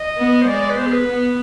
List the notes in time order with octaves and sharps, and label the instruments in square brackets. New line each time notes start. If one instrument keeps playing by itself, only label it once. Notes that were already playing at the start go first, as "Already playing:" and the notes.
Already playing: [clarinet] D#5
[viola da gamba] B3
[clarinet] C5
[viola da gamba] G#3 [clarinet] D5
[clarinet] D5
B4
[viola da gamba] B3 [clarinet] C5
[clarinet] G#4
B4
[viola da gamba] B3